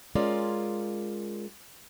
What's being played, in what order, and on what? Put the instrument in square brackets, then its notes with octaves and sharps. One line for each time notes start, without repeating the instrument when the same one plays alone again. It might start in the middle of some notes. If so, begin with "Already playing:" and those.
[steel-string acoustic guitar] G#3 C#4 F4 A#4 D5